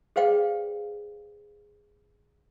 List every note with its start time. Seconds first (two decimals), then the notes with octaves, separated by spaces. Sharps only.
0.16 G#4 B4 C5 D5 F5 G5